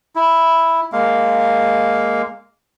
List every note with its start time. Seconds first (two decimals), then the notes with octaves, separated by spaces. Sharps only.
0.16 E4
0.93 G#3 A#3 F5